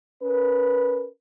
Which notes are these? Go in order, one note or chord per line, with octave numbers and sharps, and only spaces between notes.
C#4 A#4 B4